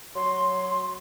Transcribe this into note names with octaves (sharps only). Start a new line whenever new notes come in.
F#3 C6